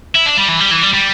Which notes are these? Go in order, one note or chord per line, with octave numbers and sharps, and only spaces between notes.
E4
D4
G3
E3
G3
E3
G3
G3